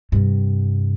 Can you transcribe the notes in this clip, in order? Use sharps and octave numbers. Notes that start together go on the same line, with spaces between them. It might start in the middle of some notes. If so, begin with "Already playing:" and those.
G2 C3